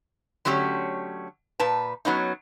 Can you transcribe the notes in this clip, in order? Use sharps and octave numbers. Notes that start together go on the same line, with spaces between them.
D3 F#3 A3 C#4 G4
A#2 B4 A5
F#3 B3 C#4 D#4